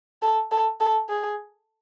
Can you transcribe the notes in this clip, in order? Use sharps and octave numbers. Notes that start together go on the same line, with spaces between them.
A4
A4
A4
G#4